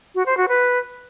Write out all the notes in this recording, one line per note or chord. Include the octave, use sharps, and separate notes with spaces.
F#4
C5
F#4
B4